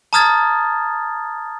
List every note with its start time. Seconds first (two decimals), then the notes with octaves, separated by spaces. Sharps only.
0.13 A5 A#5 D#6 F6 G#6 A6